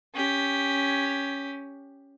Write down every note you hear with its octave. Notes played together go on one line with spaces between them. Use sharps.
C#4 G4